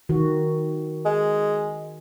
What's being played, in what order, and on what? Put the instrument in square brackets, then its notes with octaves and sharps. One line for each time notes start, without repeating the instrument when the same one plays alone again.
[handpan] D#3 F#4
[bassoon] G#3